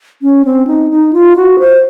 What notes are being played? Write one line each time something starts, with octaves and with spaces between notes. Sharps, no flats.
C#4
C4
D#4
D#4
F4
F#4
C5